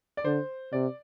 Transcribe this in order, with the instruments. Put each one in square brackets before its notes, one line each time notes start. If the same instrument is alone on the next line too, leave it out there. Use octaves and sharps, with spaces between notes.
[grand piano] D5
[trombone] D3 [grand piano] C5
[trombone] C3 [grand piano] D5